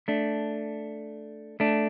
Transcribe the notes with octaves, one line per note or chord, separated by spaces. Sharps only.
A3 D4
A3 D4